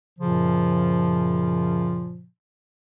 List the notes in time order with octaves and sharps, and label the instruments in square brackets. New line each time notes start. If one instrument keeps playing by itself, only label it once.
[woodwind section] F#2 A#2 C#3 F3